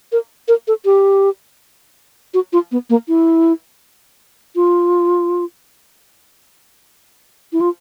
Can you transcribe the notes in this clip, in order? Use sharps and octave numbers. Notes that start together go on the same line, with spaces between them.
A#4
A#4
A4
G4
F#4
F4
B3
A#3
E4
F4
E4
F4